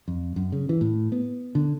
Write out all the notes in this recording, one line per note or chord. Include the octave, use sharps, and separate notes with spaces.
F2
F#2
C#3
E3
A2
B3
D3